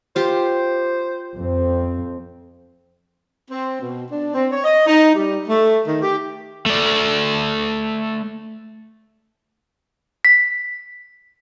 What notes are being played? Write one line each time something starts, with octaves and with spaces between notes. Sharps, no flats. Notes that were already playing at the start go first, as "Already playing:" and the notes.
F4 G4 C5
F2 C4
C4
B2
D4
C4
C#5
D#5
D#4
G3
A3
D#3
G4
A3 D5
B6